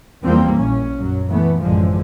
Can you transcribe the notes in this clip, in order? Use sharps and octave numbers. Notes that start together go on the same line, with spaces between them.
E2 F3 G3 A#3 C4
A#1 A2 C#4
F#2 F#3
E3 A3 B3
A1 F#2 D3 F3 G#3